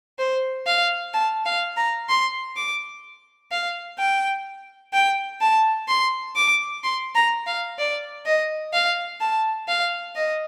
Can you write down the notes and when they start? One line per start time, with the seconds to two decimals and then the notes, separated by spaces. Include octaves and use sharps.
0.19 C5
0.67 F5
1.14 A5
1.46 F5
1.77 A#5
2.09 C6
2.56 D6
3.51 F5
3.98 G5
4.93 G5
5.41 A5
5.88 C6
6.36 D6
6.84 C6
7.15 A#5
7.47 F5
7.78 D5
8.26 D#5
8.73 F5
9.21 A5
9.68 F5
10.16 D#5